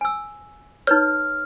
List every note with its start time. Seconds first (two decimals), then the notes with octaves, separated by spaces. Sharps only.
0.01 G#5 E6
0.87 D#4 B4 C#5 F6